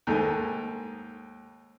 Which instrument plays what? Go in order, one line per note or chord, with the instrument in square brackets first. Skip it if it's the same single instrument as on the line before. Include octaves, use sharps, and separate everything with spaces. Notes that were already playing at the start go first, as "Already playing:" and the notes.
[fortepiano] D#2 G#2 A3 G#5